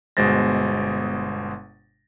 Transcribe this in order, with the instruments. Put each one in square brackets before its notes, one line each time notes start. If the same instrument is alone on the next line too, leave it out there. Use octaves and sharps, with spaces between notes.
[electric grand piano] G1 B2 G#3 C5 A6 A#6